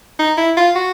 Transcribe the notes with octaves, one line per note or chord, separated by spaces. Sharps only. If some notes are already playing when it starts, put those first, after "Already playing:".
D#4
E4
F4
F#4